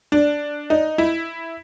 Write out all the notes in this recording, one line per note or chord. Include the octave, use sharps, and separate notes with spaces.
D4
D#4
E4